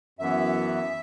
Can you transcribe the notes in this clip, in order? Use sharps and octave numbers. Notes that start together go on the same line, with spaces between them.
F#2 E3 B3 E5